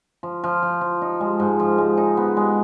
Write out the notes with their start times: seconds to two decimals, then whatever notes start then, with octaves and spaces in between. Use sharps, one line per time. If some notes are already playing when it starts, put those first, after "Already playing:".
0.23 F3
0.44 F3
0.63 F3
0.81 F3
1.02 D#4
1.21 G#3
1.40 G#2
1.60 F3
1.78 G#3
1.97 D#4
2.17 B3
2.37 G#3